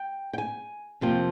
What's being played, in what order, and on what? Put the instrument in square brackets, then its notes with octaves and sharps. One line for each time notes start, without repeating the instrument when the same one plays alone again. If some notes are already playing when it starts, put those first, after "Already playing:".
Already playing: [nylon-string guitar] G5
G5
G#5
F2 C3 F3 A#3 G5